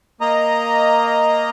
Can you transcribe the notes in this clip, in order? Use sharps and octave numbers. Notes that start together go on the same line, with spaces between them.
A#3 D#5 A#5